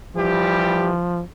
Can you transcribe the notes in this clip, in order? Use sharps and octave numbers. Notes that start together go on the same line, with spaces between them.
E3 F3 G3 G4